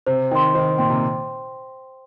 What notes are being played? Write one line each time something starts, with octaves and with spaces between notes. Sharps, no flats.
C3 C5
D#3 G5 C6
D#3 C5
A#2 G5 C6
C3